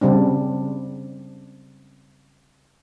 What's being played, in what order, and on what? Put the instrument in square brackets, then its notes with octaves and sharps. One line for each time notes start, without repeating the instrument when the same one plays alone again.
[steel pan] C#3 G3 C4 D4